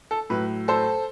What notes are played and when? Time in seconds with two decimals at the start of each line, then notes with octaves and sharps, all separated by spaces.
0.11 A4
0.30 A2 F#3 B4
0.68 A4 C5